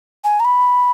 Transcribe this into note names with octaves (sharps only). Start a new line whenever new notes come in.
G#5
A#5
B5